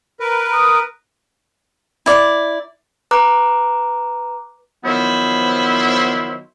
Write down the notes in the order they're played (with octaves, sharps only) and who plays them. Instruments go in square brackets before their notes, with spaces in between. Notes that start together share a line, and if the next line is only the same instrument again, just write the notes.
[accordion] A#4 B4
[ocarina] D#6
[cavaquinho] E4 D5
[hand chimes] B4 A#5 D6 F#6
[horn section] D#3 F3 F#3 B3 E4 C5